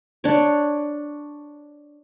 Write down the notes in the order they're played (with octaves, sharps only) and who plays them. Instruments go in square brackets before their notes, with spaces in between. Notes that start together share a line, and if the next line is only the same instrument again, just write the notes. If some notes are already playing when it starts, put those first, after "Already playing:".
[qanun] D4 C#5